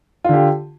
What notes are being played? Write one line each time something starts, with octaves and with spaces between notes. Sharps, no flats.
D3 F4 G4